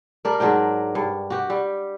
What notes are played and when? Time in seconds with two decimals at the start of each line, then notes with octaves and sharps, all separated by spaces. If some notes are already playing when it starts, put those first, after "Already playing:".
0.25 G3 D4 A#4 D5
0.40 G#2 F#3 D4 G5
0.95 G2
1.30 F#4 G4
1.50 G3